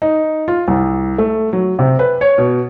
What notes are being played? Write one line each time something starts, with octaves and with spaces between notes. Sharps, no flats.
D#4
F4
C2
A3
F#3
C3
B4
C#5
B2